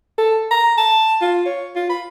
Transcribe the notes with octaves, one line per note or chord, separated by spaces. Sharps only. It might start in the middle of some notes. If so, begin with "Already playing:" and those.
A4
A#5
A5
F4
C#5
F4
B5